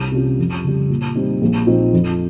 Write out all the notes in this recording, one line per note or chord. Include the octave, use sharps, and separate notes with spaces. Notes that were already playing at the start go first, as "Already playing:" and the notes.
Already playing: C2
C3 G3 C#4 F4
F2
C#3 G3
A#2
G3 C4 D#4
A#1
A#2 F3 C4 D#4
F2